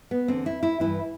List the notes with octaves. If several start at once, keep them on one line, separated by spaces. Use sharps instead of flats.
B3
E2 D3 C4
E4
E4
G2 E3 E4